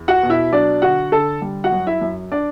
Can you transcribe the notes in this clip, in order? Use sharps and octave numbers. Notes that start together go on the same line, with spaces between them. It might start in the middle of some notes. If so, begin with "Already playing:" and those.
Already playing: E2
F#4 F#5
B2
E4 E5
F#3 D4 D5
D3 F#4 F#5
D3 A4 A5
G3
F#4 F#5
F#2
E4 E5
F#2
D4 D5